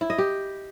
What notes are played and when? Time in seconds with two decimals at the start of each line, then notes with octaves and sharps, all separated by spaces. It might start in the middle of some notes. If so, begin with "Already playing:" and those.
0.01 E4
0.10 D#5
0.18 G4